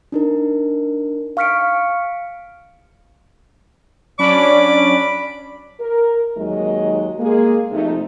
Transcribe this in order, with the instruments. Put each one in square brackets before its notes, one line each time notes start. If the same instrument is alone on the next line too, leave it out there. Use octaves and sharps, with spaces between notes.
[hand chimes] D4 D#4 A#4
F5 C#6 F6 B6 C#7 D7
[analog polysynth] F#3 C#4 D4 [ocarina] D5 [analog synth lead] B5 [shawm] D6
[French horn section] A#4
D#2 F#3 G#3 D#4 D#5
G#3 A#3 G#4
C3 F3 A3 D#4